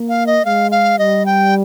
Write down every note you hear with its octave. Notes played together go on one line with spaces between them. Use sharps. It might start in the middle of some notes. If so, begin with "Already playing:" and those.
Already playing: A#3
F5
D#5
G#3 F5
F5
G3 D#5
G5